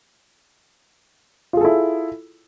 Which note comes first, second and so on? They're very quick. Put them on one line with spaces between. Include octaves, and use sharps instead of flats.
F4 G#4 A4 E4